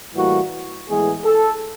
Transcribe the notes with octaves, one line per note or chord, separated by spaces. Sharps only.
A2 E3 G3 A#3 F#4
A2 E3 G#3 B3 G#4
A4